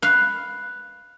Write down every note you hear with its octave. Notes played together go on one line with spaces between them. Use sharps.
B4 F5